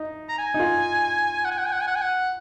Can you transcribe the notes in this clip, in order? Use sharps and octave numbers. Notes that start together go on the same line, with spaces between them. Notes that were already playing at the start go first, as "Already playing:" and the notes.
Already playing: D#4
A#5
G#5
D#4
F4
F#5
G#5
F#5
G#5
F#5
G#5
F#5
G#5
F#5